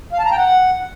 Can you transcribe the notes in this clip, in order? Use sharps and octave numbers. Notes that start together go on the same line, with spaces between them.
F5
A5
A#5
G5
F#5